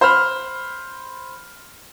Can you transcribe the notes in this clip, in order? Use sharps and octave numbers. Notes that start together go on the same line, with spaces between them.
C5 B5 F6